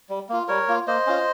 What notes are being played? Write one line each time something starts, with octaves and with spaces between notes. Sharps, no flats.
G3
A#3 F4
G3 A#4 C#5
A#3 F4
A#3 C5 D#5
C#4 F4